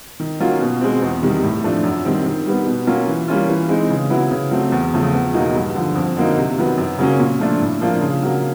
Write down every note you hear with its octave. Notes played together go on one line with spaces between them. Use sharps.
D#3
F#3 A#3 C#4 F4
B2
G#3 C4
E2
C3 D#3 G3
A2
F3 A3 D4
F#2
D#3 G3 C4
D#3
G3 B3
B2
F#3 A#3 C#4 F4
E3
G3 A#3 C#4 F4
E3
G#3 C4 D#4
C#3
F#3 B3 E4
C#3
F#3 A3 C4
E2
C#3 F3 A3
E2
B2 F#3 A#3 D#4
G2
D3 F3
F2
D3 F#3 A#3 D#4
C3
D#3 F#3 B3
F#2
C#3 F#3 A#3 C#4
A#2
F3 A3 D4 F4
A2
F3 A#3 D4 F4
C#3
F#3 A#3